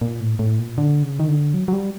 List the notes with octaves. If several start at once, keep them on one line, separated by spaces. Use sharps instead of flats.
A#2
A2
A2
A#2
D3
C#3
D#3
D3
F#3
F#3
G3